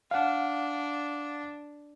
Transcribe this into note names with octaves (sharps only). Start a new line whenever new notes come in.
D4 F5 F#5